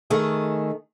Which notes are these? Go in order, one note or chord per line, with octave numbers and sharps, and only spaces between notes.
D#3 A3 G#4